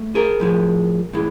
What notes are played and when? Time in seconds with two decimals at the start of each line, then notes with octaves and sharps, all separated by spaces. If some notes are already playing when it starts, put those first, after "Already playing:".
Already playing: A3
0.15 G#4 A#4
0.40 A2 F3 G#3
1.13 A2 E3 G#3